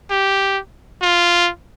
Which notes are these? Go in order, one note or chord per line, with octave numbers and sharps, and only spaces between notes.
G4
F4